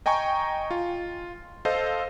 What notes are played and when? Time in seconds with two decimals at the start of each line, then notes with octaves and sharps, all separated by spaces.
0.06 D#5 G5 G#5 A#5 C#6
0.71 F4
1.65 A4 C5 D#5 F5